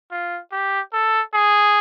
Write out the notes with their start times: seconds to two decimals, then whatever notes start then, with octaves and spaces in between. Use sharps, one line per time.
0.11 F4
0.52 G4
0.93 A4
1.34 G#4